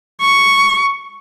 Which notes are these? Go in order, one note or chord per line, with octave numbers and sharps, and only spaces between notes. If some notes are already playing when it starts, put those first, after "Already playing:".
C#6